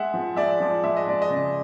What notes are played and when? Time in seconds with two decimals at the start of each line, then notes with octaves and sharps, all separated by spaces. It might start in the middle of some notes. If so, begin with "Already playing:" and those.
Already playing: G#3 E5 F#5
0.14 F3
0.36 G#3 D5 E5
0.60 F3
0.83 G#3 E5
0.97 D#5
1.07 G#3 D5
1.22 D#5
1.30 C#3